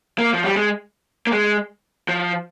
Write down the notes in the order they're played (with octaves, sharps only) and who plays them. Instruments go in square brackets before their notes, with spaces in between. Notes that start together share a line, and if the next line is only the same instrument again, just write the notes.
[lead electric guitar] A#3
F3
G3
G#3
A#3
G#3
F3